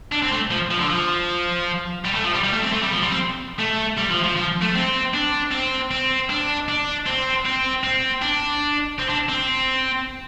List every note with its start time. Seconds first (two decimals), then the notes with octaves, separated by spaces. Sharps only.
0.12 D4
0.23 C4
0.32 A3
0.51 F3
0.71 F3
0.80 D3
0.90 F3
2.05 G3
2.15 A3
2.25 F3
2.34 G3
2.44 G3
2.54 A3
2.63 C4
2.73 A3
2.83 G3
2.92 F3
3.02 G3
3.11 C4
3.59 A3
3.98 G3
4.11 F3
4.24 F3
4.37 F3
4.62 A3
4.75 C4
5.14 D4
5.52 C4
5.91 C4
6.30 D4
6.69 D4
7.07 C4
7.45 C4
7.84 C4
8.22 D4
8.99 C4
9.09 D4
9.29 C4